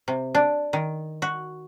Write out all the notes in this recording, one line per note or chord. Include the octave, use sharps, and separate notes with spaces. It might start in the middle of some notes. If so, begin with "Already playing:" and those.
C3
D4
D#3
F#4